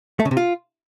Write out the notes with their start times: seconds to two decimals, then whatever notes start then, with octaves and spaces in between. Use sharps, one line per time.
0.20 A3
0.25 C#3
0.31 C3
0.37 F4